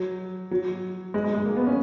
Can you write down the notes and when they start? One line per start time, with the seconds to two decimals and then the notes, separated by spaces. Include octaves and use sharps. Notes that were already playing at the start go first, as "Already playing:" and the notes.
Already playing: F#3
0.51 F#3
1.14 G#3
1.24 G#3
1.34 G#3
1.46 A#3
1.56 B3
1.67 C#4